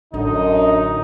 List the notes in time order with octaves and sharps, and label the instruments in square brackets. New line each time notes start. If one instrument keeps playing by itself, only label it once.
[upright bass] A1 E4 [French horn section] F#2 D3 [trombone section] D#4